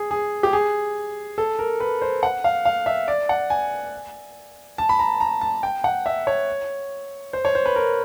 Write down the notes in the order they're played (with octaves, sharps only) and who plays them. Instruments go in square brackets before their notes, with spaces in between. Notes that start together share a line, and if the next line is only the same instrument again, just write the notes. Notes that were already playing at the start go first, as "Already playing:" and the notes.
Already playing: [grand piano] G#4
G#4
G4
G#4
A4
A#4
B4
C5
F#5
F5
F5
E5
D5
F#5
G#5
A5
B5
A#5
A#5
A5
G5
F#5
E5
C#5
C5
C#5
C5
B4
A#4